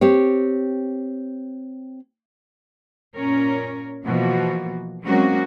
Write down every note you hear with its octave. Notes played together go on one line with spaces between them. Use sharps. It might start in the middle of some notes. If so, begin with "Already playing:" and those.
C4 G4 C#5
A#2 C#4 A#4 C#5
B2 E3 F3 A#3 F#4
F#3 G#3 A#3 C4 C#4 F#4